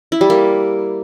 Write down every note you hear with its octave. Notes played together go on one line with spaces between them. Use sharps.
E4
G3
A#3